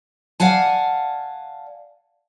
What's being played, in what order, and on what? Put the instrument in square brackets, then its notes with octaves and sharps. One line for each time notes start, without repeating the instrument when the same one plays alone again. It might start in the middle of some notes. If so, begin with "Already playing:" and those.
[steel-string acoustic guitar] D5 F5 F#5 G#5 A5